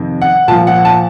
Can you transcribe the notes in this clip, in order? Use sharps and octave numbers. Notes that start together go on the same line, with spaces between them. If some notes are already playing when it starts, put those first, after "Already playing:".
Already playing: F2 C3 D#3
F#5
A#2 F3 A5
F#5
A5